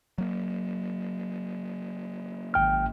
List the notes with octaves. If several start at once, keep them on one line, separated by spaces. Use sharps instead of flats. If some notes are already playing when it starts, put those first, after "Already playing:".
F#3 A#3
G#1 G5 F6